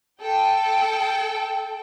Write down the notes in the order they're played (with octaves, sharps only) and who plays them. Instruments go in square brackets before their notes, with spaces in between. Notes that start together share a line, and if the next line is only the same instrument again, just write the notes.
[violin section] A4 G5